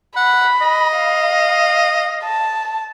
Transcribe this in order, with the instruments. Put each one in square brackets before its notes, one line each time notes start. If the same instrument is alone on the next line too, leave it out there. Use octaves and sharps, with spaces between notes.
[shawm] F#5 [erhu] B5
[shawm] D#5
[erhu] F5
A5